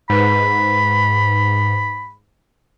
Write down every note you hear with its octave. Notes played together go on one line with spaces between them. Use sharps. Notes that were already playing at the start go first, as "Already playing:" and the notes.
G#2 B4 B5